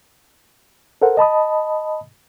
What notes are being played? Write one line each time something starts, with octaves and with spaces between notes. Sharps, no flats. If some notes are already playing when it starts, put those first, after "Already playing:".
A4 A#4 C5 F#5
D#5 A5 B5 D#6